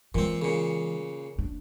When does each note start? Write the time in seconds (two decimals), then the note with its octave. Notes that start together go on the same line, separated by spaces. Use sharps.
0.15 A#2 E3 G#3 C4
0.42 A#2 C#3
1.38 F#1 D4